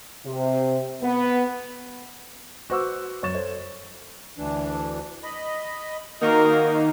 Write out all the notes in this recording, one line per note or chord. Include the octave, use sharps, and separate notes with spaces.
C3
B3
F#4 B4 C5 C#6 D6 E6
F#2 C#5 C#6 A6 E7
A4 C5 C#5
D2 E3 D4
D#5 B5
D#3 A#3 D#4 F#4 A#4 F5